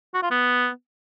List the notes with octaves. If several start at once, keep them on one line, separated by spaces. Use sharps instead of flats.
F#4
F4
B3